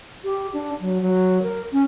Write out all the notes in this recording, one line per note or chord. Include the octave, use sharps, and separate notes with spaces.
G4
D4
F#3
F#3
A#4
C#4